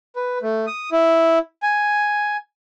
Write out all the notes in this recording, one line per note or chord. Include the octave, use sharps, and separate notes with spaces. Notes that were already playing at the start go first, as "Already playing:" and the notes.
B4
A3
D#6
E4
G#5